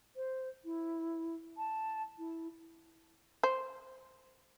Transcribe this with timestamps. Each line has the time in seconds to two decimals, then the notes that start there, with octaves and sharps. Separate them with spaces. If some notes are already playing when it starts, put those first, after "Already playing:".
0.16 C5
0.65 E4
1.57 A5
2.18 E4
3.43 C5